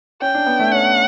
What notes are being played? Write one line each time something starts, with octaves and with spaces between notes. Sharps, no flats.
C#4 G5
D4
B3
A3
C#4 F#5